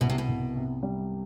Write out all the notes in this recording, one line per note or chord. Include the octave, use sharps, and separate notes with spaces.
C2 B2
C3
B2
C2
C3
G3